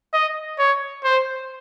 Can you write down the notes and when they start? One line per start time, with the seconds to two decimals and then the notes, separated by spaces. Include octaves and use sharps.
0.14 D#5
0.59 C#5
1.04 C5